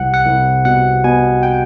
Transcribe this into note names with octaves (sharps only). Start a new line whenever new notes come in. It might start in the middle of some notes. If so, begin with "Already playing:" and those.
Already playing: C2 F#5
F#5
C2
B2 F#5
B2 G#5
G5